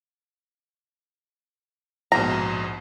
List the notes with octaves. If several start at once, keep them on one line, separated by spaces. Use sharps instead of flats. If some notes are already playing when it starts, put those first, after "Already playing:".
A#1 G#2 B2 A#5